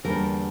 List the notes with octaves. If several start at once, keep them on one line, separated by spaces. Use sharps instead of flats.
E2 D3 G3 A#3 A#4